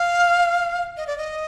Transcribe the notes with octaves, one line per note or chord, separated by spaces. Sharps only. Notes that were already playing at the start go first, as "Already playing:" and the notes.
Already playing: F5
D#5
D5
D#5